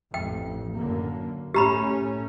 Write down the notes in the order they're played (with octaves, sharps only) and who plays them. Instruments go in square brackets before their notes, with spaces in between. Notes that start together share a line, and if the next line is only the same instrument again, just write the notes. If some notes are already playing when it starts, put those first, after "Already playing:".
[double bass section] A1 F2 [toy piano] G5
[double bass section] F#2 D3 A#3
[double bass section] A2 A3 C#4 [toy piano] G4 A#5 B5